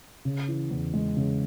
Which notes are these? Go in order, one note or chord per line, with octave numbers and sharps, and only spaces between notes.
C#3
E3
E2
G#3
C#3